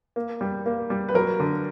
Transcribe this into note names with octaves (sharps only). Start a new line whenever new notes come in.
A#3
G3
A#3
G3
B4
F#3 A#4
D3